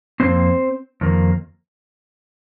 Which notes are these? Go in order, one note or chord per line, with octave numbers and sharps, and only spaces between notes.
F2 D#3 A#3 C4 C5
F2 D#3 A#3